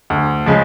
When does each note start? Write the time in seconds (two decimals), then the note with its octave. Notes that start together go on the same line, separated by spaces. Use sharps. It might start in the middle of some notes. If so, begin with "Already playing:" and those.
0.10 D2
0.46 C#3 F3 G#3